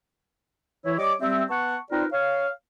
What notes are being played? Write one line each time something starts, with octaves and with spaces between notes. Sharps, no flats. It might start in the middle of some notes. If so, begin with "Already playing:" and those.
E3 E4 C#5
G3 C#5 D#5 D6
G3 C4 E5
B3 F#5 A5 C#6
C4 D#4 F4 A#4 B4 D5
C#5 F5